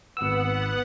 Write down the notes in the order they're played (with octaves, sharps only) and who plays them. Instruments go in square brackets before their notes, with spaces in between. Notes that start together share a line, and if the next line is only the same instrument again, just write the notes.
[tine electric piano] G#1 E6 [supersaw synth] B3 F#5